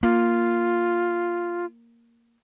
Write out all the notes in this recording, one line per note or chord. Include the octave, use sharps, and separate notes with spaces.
A#3 F4